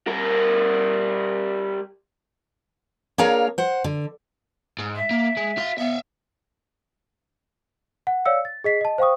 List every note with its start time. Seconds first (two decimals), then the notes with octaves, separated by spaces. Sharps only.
0.08 G3 A#4
3.18 A#3 D4 G#4 A#4 C#5 F5
3.58 C5 F#5
3.84 D3
4.79 G#2
4.96 E5
5.11 A#3
5.37 G#3
5.58 F#4 F5
5.78 B3 E5 F5
8.07 F#5
8.25 C#5 D5 F5 E6 C#7
8.45 A6
8.64 G#4 D#5 B6 C7
8.81 D#5 A5
8.98 C5 F5 G5 C#6 D#6